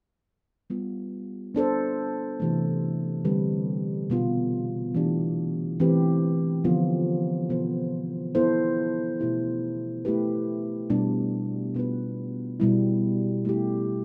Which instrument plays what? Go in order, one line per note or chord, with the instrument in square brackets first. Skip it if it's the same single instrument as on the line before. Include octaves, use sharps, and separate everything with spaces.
[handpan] G3 B3 F4
B3 D4 A4 C5
C3 E3 A3
D3 G3 C4 G4 B4
B2 B3 F4
E3 A3 D4 G4
E3 A3 C4 G4 B4
D3 F3 B3 F4
B2 B3 F4 A4 C5
B3 E4 A4 C5
B2 A3 E4 G4
A3 E4 G4 B4
B2 G3 B3 D4
B2 B3 F4 B4
B2 G3 B3 E4
A3 E4 G4